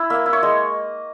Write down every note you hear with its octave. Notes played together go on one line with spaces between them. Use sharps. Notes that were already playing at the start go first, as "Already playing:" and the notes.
Already playing: E4
A#3 E5
E4
C#5
G#3 D#5